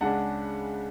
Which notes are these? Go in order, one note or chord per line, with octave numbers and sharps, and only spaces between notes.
C#2 C#3 G#3 D4 F#5 A5